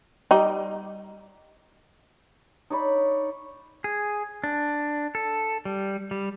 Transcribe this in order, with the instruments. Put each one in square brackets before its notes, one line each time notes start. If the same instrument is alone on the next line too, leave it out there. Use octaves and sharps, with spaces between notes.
[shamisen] G3 D#4
[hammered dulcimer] D#4 C#5 D5 B5
[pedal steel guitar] G#4
D4
A4
G3
G3